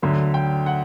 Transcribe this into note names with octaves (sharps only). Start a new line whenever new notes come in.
D2 D3 F#3
G5
F#5